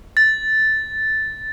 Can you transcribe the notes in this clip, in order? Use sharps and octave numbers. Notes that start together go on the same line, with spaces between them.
A6